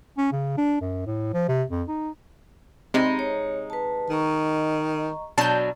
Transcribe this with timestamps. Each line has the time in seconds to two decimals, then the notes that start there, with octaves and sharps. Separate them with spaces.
0.18 C#4
0.32 C#3
0.58 D4
0.81 F#2
1.06 A2
1.34 F3
1.48 C3
1.70 F2
1.88 D#4
2.94 C3 G#3 C4 D#4 B5
3.19 C#5
3.70 B4 A5
4.10 D#3 D#5 A#5 C#6
5.38 B2 F#3 D4 A5 G6